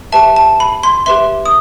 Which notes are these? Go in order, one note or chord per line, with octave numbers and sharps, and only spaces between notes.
G4 B4 E5 A5
A5
B5
C6
G4 B4 E5 C6
D#6